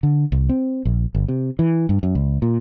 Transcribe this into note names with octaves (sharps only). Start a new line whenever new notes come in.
D3
C2
C4
A#1
G1
C3
E3
G2
F#2
C#2
A#2